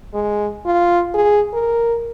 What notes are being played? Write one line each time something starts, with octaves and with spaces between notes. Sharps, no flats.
G#3
F4
G#4
A#4